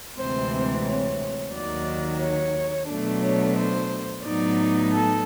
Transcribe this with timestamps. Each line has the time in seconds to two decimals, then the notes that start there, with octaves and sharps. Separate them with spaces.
0.18 D2 C3 E3 G#3 C4 C5
0.87 C#5
1.54 D#2 D#3 F#3 D5
2.21 C#5
2.89 B2 F#3 A3 D4
3.23 C#5
3.57 C5
4.24 A2 F#3 B3 D#4 D5
4.92 A4